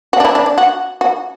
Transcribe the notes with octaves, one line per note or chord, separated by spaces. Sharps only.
F#4
D4
E4
D4
D4
F#4
F#4